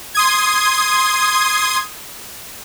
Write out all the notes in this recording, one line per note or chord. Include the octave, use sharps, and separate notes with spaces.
C6 D#6 G#6